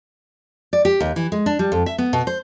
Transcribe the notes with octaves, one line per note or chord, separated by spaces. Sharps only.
D5
G4
D#2
E3
G#3
D4
G3
F2
E5
B3
B2
C5